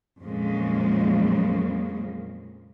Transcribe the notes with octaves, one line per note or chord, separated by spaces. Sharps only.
F2 A#2 C#3 F#3 G#3 A#3